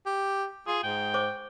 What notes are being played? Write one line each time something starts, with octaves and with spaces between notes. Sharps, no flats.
G4
F4 G#4
G#2 G5
C5 C#6 D6